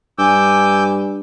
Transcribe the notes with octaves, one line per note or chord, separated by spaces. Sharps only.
G2 G#5 D6 E6 G6